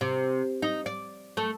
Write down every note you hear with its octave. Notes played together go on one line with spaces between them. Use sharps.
C3
D#4
D5
A3